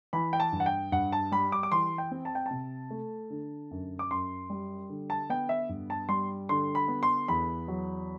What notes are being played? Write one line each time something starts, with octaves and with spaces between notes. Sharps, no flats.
E3 B5
G5
A5
G2
F#5
G5
G2 F#5
A5
G3 B5
D6
D6
E3 C6
G5
C4
A5
G5
C3 A5
A3
D3
F#2
D6
F#2 C6
G3
D3
A5
B3 G5
E5
G2
A5
G3 C6
D3 C6
B5
B3
C6
E2 B5
F#3